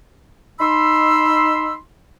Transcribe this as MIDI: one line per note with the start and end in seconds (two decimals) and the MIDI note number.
0.60 1.74 63
0.60 1.74 83
0.60 1.74 84
0.60 1.74 88